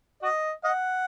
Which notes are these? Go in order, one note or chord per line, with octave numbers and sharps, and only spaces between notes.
F#4 D#5
D#5 F#5